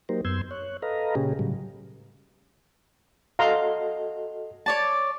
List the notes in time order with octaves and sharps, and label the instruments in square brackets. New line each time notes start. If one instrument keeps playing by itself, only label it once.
[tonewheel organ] F#3 A#3 D#4 G4 A#4 C5
F#2 B3 C6 E6 G6 G#6
C#5 F#6
A4 B4 D#5 F5 A#5
A#2 C#3 C#4 G4 G#4
A2 C#3 F#3 G3
[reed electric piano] F#4 A4 D#5 [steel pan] F5 A#5 C6
[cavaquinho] C#5 D5 A5